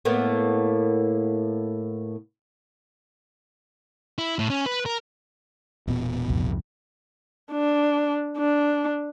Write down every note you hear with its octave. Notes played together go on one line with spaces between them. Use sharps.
A2 A#3 B3
E4
A2
C#4
B4
A#4
E1 A#2 B3
C2 F2 G#2
D4
D4